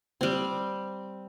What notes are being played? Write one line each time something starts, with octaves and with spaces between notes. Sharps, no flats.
G3 C4